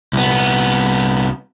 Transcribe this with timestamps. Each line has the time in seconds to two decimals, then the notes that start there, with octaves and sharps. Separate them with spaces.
0.13 C2 B3